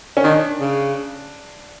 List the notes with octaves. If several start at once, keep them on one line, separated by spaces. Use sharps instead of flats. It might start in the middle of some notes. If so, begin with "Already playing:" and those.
C#4
D#3 D4
C#3